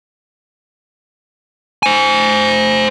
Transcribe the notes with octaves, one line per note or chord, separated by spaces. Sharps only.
C5 G#5